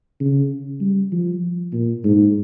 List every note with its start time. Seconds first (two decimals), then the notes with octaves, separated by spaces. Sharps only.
0.20 C#3
0.81 G3
1.12 F3
1.73 A#2
2.04 G#2